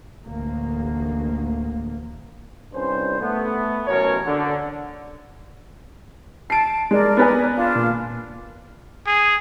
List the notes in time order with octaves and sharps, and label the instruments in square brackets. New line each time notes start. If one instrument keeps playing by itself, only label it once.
[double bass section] A1 D2 A#3
[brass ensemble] C2 G2 C#4 C5
A3 B3
A1 F#2 B2 C#4 A#4 C#5
D3
[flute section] A5 [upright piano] C7 D7
[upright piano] G#3 [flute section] A#4 D5
[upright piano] B3 B4 G#5
[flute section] D4 F4
[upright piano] A#2
[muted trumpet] G#4